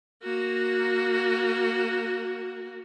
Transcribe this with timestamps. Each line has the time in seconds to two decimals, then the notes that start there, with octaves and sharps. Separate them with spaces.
0.23 A#3 F#4